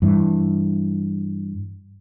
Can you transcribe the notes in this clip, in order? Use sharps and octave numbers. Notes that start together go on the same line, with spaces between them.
G2 E3